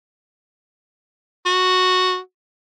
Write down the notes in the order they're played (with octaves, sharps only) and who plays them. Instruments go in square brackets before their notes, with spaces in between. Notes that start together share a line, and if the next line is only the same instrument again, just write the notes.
[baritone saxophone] F#4